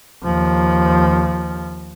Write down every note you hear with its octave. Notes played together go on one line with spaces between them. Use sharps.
D#2 F3